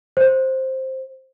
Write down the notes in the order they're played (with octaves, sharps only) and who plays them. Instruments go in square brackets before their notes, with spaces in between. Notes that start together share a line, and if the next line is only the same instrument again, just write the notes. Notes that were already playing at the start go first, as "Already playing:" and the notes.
[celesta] C5